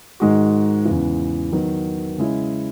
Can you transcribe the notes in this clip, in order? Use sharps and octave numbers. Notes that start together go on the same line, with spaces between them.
G#2 D#3 G#3 D#4 F#4
E2 C#3 E3
D#3 F#3 B3
C#3 G#3 C#4 E4